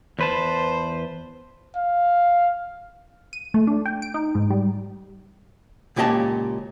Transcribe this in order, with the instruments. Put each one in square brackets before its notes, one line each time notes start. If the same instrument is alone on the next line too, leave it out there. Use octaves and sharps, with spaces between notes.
[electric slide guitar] E2 B4 A5 [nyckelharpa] C5
[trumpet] F5
[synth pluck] D#7
A3
D4
G5
D7
D#4
G#2
G3
[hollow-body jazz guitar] C#2 A#2 C#4 G4 D#5 A5